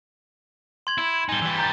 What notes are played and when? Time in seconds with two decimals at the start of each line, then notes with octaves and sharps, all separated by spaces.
0.87 C6 G#6 F#7
0.98 E4
1.29 G3 D#4 G#5 G7
1.42 E3 G3
1.58 A#5 G6 A6